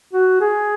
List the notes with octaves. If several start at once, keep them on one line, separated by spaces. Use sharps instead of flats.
F#4
G#4